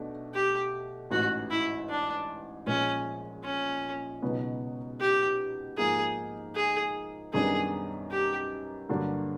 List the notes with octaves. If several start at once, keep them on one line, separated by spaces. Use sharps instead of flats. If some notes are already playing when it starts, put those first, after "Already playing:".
Already playing: B1 B2 A3 D4
G4
A1 G#2 E3 F#4
E4
D4
A#1 A#2 F3 G#3 C#4
C#4
C#2 B2 F#3 B3 D#4
G4
G#2 F3 A#3 D#4 G#4
G#4
F#2 D#3 G3 B3 D4 G#4
G4
G2 D3 F#3 A#3 D4